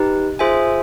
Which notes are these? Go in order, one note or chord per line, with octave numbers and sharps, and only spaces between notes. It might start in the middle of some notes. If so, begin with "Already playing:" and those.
Already playing: D#4 G4 B4
F4 G#4 C5 E5 G#5